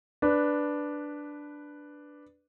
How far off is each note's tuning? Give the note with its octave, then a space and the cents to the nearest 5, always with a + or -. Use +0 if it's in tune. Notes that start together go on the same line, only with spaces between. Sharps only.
D4 +0 B4 +0